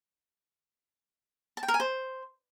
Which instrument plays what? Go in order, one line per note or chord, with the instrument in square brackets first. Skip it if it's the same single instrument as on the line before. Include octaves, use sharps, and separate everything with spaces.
[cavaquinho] A5
G5
A#4
G#5
C5